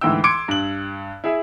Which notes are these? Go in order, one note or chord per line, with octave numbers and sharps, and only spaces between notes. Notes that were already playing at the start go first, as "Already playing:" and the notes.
D2 G#2 E3 E4 G5 E6
C6 D6 G#6 C#7 D7
G2 F#7
E4 G#4 E5